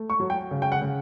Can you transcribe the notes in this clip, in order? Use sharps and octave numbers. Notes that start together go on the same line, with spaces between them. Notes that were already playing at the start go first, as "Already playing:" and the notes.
Already playing: A3
C#6
F#3
G5
C#3
G5
F#5
C#3